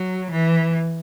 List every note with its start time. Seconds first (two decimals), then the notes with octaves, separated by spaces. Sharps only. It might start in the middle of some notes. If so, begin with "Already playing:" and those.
Already playing: F#3
0.31 E3